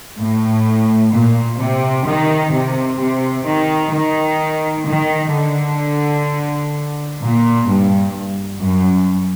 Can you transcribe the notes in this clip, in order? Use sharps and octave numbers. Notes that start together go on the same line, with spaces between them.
A2
A#2
C3
D#3
C3
C3
D#3
D#3
D#3
D3
A#2
G2
F#2